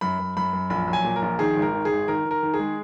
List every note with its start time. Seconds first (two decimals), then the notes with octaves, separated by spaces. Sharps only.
0.01 F#2 B5
0.19 F#2
0.37 F#2 B5
0.53 F#2
0.70 A#1 B5
0.88 F#3
0.93 G#5
1.04 A#2
1.16 A#4
1.22 A#1
1.39 D#3 G#4
1.57 G#1
1.62 A#4
1.73 D#3
1.85 G#4
1.91 G#1
2.08 D#3 A#4
2.25 D#3
2.31 A#4
2.43 D#3
2.54 G#4
2.59 G#3